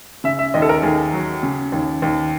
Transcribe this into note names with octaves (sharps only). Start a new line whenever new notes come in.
C#3 E5
E5
D#2 D#5
A4
A#4
D#2 G#4
F#3
C#3
D#2
D#2